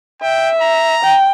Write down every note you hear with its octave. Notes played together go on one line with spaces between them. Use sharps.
E5 G5
A#5
G5